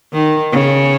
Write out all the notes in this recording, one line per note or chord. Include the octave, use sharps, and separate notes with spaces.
D#3
C#3